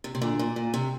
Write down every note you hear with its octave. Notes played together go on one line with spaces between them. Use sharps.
C3
C3
A#2 D3
A#2
A#2
C3